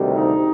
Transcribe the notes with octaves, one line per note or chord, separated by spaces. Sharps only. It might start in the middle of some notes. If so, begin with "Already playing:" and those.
Already playing: D2 C3 D#3 G3
D#4